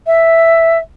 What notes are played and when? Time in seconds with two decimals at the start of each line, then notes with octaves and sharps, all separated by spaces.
0.07 E5